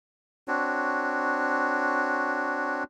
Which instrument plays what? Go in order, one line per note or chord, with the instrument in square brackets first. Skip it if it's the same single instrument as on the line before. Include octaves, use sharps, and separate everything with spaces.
[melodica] C4 D4 F#4 C#5